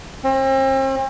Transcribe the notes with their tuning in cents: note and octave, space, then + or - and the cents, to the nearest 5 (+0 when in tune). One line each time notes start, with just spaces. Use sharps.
C4 +40